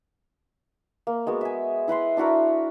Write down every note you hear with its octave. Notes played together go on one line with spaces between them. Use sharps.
A#3
G#3 B3 F#4
E5 G#5
E4 B4 F#5 C6
D4 E4 F#4 A#4